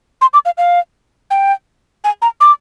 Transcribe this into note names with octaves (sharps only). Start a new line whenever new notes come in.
C6
D6
F5
F5
G5
G#5
A#5
D6